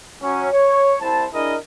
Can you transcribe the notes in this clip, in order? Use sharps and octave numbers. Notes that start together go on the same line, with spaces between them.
F#3 C#4
C#5
C2 E4 C5 A5
D4 E4 G#4 A#4 D#5